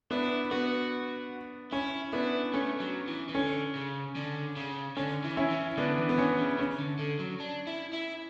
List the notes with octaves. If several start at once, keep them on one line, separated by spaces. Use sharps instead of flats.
B3 D4 E4
B3 F#4
C#4 E4
B3 D4 E4
A3 C#4
F#3
E3
E3
D3 C#4
C#3
D3
C#3
D3 C#4
E3
C#4 E4
E3
D3 B3 D4
E3
B3
E3 C#4
C#3
C#3 C#4
D3
D3
F#3
D4
E4
E4